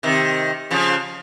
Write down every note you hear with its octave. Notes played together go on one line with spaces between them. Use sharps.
C3 D#3
C#3 F3